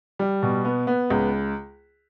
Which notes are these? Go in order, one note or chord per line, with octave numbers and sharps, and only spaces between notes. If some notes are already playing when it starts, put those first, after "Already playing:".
G3
B2
B3
B3
C#2